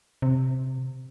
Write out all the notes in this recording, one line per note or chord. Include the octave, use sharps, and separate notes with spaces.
C3